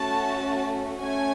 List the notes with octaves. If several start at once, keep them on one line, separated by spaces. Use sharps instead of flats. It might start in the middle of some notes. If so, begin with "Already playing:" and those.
Already playing: A3 C#4 F#4 A5
A3 C#4 G#5